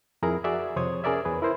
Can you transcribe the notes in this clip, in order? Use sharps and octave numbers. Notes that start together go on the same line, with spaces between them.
F2 E4 G#4 A#4 A#5
F#4 G#4 D5 E5
F2 C3 C5 C#5 D#6 G#6
C#4 G#4 A#4 D5 E5
E2 G#4 B4
E4 A#4 C5